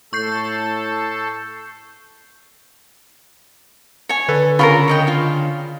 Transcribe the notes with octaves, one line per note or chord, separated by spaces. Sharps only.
A2 A4 C#6 G6 C7
C#5 G#5
D3 A4 B4
C#3 F4 G4 A#4 B5 C#6
C#5 D#5 G5
F4 F5